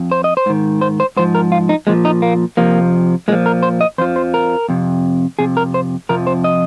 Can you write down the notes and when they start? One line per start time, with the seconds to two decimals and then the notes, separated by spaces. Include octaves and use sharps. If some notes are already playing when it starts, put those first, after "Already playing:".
Already playing: F2
0.12 C5
0.24 D#5
0.37 C5
0.46 G#2 D#3
0.81 C5
1.00 C5
1.17 G#2 F3 C5
1.35 A#4
1.52 F4
1.69 D#4
1.87 A#2 F3 G#3
2.05 D#4
2.22 A#3
2.57 F2 C3 F3 A#3
3.28 A#2 G#3
3.32 F3
3.46 A#4
3.63 C5
3.81 D#5
3.98 F2 C5
4.01 F3
4.16 C5
4.34 A#4
4.69 F2 C3
5.39 F2 C3 G#4
5.57 A#4
5.74 C5
6.09 F2 C3 F3 A#4
6.27 C5
6.44 D#5